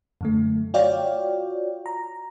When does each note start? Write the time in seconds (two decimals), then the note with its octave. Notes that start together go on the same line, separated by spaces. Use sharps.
0.21 F#2 D3 A3
0.74 F4 F#4 C#5 D5 F5 G5
1.86 A#5